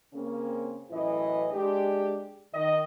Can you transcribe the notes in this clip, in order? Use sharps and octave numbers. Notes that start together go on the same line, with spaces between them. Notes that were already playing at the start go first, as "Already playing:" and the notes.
C#3 A#3 C4 C#4
F#2 A2 E3 E4 B4 D#5
G#3 D4 G4
D#3 D#5